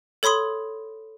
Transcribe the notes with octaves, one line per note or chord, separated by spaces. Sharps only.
A4 C#5 B5 C6 D#6